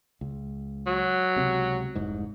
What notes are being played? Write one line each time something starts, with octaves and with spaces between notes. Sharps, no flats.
C#2
F#3
C#2 C3
F1 C2 G#2